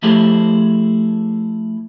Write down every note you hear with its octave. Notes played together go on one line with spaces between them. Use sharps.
F3 A3 E4 G4 G#4 C5